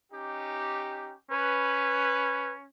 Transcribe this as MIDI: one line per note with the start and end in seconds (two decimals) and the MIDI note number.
0.12 1.12 61
0.12 1.12 63
0.12 1.12 67
1.31 2.67 61
1.31 2.53 71